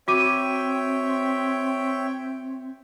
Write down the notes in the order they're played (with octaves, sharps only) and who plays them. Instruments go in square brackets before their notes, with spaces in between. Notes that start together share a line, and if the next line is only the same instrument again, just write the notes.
[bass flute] C4 [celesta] F#4 D6 D#7 [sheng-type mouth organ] C#5 E5 G5